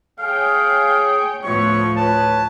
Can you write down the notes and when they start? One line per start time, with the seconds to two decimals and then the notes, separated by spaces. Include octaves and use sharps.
0.19 G#4 C#5 F5 G5
1.44 D2 A2 F3 B3 E4 C#5 C#6
1.96 B4 C#5 A5